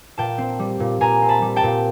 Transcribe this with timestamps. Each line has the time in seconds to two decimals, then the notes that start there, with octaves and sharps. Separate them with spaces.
0.18 A#2 G5 A5
0.38 C4
0.59 G3
0.80 A#2
1.01 A#2 G#5 A#5
1.22 C4
1.29 A5 B5
1.42 G3
1.56 G5 A5
1.63 A#2